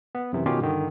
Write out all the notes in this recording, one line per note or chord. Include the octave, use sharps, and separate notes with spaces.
B3
F#2 C3 E3
B2 D#3 C#4 F4 G4
G2 D3 D#3